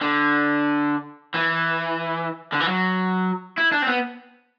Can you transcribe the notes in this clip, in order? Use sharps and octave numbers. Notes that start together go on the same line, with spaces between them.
D3
E3
D3
E3
F#3
E4
D4
C4
B3